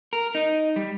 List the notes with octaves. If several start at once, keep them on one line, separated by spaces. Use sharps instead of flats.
A#4
D#4
G3